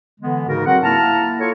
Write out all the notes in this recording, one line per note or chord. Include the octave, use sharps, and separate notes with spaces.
D3 E3 G#3 B3
G#2 C#3 D#4 F#4 A#4
F#3 C4 F#4 F#5
A#3 E4 A5 A#5 F6
F4 A4 C#5